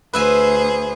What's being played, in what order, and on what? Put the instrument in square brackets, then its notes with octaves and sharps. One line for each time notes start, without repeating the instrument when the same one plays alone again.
[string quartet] D2 G#4 C5 [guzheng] B4 E5 G#5